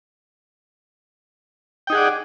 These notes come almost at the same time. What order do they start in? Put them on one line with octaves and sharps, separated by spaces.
G5 D#4 G#4 F#5 D5